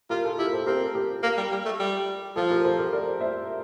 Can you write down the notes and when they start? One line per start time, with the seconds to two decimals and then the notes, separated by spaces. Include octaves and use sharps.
0.10 F4 G4 A#4
0.24 F4 A4
0.38 E4 G4 A#4
0.52 A4 C5
0.66 C4 G4 A#4
0.95 G4 A#4
1.23 A#3
1.37 G3
1.51 G3
1.65 A3
1.80 G3
2.36 F3 F4 A4
2.51 G4 A#4
2.64 A4 C5
2.79 G4 A#4
2.93 A#4 D5
3.21 C5 E5